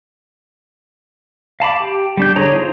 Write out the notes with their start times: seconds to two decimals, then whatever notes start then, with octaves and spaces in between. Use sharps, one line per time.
1.60 F5 A5 B5 D6
1.80 G4
2.17 G3 D4 G6
2.36 D3 D4 G#4 C#5 A#5
2.53 D#4 F4 C5